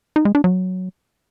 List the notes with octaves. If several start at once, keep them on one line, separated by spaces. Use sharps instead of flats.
D#4
G#3
D4
F#3